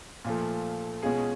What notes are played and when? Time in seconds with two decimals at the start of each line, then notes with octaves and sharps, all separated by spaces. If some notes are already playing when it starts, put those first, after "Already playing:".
0.25 A#2 F3 A3
1.03 B2 G#3 C#4 F4 G#4